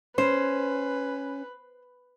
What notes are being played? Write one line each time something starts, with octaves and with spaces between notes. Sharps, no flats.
C#4 B4 C5